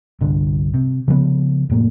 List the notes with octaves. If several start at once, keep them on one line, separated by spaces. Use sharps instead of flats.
G1 C2 D3
C3
C#3 F3 G#3 B3
F1 A2 A#3